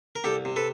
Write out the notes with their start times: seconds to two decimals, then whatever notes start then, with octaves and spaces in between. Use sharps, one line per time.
0.16 A#4
0.24 C2 G4 A4
0.45 C3
0.56 A4 B4